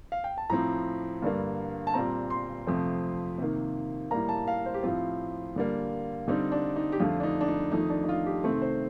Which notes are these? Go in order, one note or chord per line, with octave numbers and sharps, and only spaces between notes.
F5
G5
A5
A2 F3 C4 A#5
G2 D3 G3 A#3
A5
A#2 G3 C4 A#5
C6
F2 C3 F3 A3 C4
C3 D#3 A#3
A2 G3 A#3 A#5
A5
F5
C5
G4
A2 F3 C4 F4
D3 G3 A#3
D3 G3 C4 D#4
D4
D#4
G4
F2 D3 A3 F4
D4
D#4
D4
D#4
F2 D#3 A3 D#4
D4
D#4
F4
G4
C3 D#3 A3 C4
C5